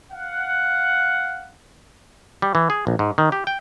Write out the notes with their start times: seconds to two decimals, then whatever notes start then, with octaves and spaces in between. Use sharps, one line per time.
0.12 F5 F#5
2.42 G3
2.55 E3
2.70 G#4
2.87 A#1
2.99 G#2
3.18 D#3
3.32 G4
3.47 G5